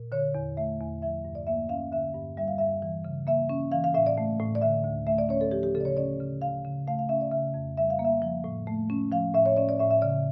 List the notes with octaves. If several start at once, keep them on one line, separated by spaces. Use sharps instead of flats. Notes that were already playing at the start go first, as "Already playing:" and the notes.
Already playing: A#2
D3 C#5
E2
A3 E5
E2
F3 E5
G2
D5
A#3 E5
C#4 F5
D3 E5
G2
G3 E5
F5
G2 E5
E3
C#3
A#3 E5
C#4
E3 F5
F5
A2 E5
D5
A3
A2
D5
D3 E5
D2
A3 E5
D5
C#4 C#5
A4
F3 G4
G4
C#3 A4
D5
C#5
C#4 D5
C#3
F3 F5
C#3
A3 F5
F5
C#4 E5
D5
C#3 E5
F2
G3 E5
F5
A#3
E5
F3
A2
A3
C#4
F3 F5
A2 E5
C#5
C#4 D5
D5
A2 E5
E5
C#3 D5